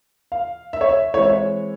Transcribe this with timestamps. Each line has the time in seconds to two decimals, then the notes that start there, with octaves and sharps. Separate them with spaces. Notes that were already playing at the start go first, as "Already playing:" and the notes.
0.32 F5
0.73 E5
0.81 C#5
0.89 E5
1.14 E3 G#3 C4 C#5
1.22 E5
1.30 C#5